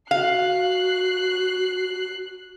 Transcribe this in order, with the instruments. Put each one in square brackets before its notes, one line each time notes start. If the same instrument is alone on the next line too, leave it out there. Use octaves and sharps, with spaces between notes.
[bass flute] F#4 [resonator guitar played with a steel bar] F5 [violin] F#6 C7